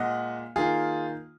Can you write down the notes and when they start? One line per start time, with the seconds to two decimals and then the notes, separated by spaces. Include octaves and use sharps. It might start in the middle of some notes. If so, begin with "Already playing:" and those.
Already playing: A#2 G#3 D#5 F#5
0.56 D#3 A#3 F4 G#4